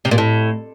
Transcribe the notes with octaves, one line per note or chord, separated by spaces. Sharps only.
C3
A#2
A2